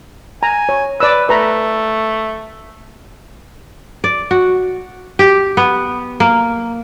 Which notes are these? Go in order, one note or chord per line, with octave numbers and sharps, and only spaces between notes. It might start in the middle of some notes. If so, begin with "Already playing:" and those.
G#5 A#5
C#5
B4 D5 E6
A3 B4 A#5 B5
D5
F#4
G4
B3
A#3